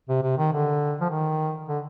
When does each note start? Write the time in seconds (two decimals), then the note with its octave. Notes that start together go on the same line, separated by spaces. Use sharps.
0.09 C3
0.23 C3
0.38 D#3
0.53 D3
1.01 F3
1.10 D#3
1.68 D3